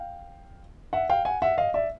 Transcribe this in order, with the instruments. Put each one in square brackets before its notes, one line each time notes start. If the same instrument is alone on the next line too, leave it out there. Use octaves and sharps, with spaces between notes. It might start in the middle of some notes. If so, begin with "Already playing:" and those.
Already playing: [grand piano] F5 G5
E5 F#5
F5 G5
F#5 G#5
E5 F#5
D#5 F5
D5 E5